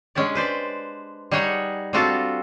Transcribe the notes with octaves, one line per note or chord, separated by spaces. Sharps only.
G#3 C#4 D4 G4 D5
B4 C5 D5
G3 D#4 G#4 C#5 F#5 G#5
G3 C4 D4 F4 F#4 A4